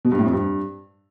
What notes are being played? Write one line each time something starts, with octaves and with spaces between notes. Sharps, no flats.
B2
G2
A2
F2
G2